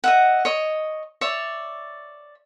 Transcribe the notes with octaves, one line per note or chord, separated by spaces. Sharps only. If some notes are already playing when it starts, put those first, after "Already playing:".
D#5 E5 F#5
C#5 D#5
C#5 D5 E5